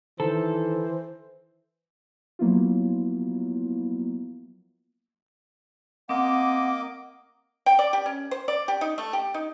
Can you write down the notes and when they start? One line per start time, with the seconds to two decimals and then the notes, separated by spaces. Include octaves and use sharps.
0.20 D#3 E3 A4 C5
2.39 F3 F#3 A#3 B3 E4 F4
6.09 A#3 C4 D#5 F#5 D6
7.66 G5
7.79 D5
7.93 G4
8.06 C#4
8.31 C5
8.48 D5
8.68 G4
8.81 D#4
8.98 A3
9.13 G4
9.34 D#4